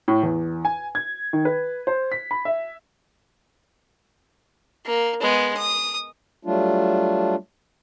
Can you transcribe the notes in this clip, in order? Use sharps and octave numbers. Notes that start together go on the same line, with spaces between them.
A2
E2
G#5
G#6
D#3
B4
C5
B6
B5
E5
A#3
G#3 B3
D#6
F#3 G3 A3 D4 F4